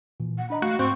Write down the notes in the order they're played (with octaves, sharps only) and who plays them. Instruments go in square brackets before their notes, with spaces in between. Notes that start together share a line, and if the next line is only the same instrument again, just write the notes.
[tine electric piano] A#2 E3
[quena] F#5
[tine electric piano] D4 D#5 A#5 [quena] B5
[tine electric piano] A3 [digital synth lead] F#4 [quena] F5
[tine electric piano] G#2 [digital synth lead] C4 [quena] C#6